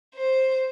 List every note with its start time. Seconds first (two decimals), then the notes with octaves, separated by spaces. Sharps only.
0.15 C5